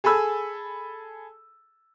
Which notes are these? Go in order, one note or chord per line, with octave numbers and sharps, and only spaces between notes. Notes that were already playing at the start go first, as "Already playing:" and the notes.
G#4 A4 G#5 B5 E6